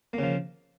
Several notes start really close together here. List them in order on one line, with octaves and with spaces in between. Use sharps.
A#3 C#3 F3